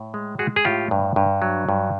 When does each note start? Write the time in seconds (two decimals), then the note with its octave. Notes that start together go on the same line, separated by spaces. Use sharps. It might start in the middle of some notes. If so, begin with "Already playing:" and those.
Already playing: A2
0.14 G#3
0.39 G#3 F#4 G#4
0.56 G#4
0.65 A2 F4 G4
0.91 G2
1.16 G2
1.42 F#3
1.69 G2